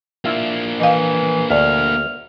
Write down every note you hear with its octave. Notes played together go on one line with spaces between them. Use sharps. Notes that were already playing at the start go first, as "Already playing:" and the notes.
A#3 D4 E4 F4 E5
E3 D#5 F5
D2 D5 F6